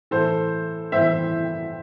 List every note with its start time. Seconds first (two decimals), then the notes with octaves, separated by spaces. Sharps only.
0.11 A2 E3 A4 C5
0.92 A2 E3 C5 E5